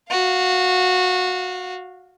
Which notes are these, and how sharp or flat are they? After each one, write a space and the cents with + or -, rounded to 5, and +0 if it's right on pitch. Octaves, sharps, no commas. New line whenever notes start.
F#4 -15 F5 +0